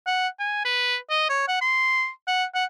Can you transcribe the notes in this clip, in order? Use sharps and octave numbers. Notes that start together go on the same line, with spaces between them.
F#5
G#5
B4
D#5
C#5
F#5
C6
F#5
F#5